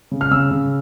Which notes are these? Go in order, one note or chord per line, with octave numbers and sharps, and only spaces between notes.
C#3
F6
C#3 E6
C#3